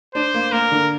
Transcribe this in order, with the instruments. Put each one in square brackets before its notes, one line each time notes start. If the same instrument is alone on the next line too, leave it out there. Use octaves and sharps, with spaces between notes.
[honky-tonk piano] D4 [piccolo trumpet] C5
[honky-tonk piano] A#3
[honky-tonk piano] A#3 [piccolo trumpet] A#4
[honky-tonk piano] D3